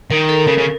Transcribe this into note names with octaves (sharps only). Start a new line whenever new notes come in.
D#3 A#4
A4
C#3 A#4
C#3